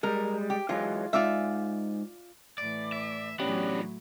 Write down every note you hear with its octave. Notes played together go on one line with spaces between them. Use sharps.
G3 G#3 A#4
G4
E3 F#3 G#3 F4
G#2 F4 D5 E5
A2 E3 D5
E5
A2 E3 F#3 B3 C#4 D4 G4 D5